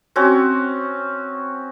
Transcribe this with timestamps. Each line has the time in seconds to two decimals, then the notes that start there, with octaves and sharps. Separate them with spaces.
0.16 C4 C#4 F#4